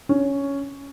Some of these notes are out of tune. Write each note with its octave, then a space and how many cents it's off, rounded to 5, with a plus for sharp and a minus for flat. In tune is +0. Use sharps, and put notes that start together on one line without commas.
C#4 +5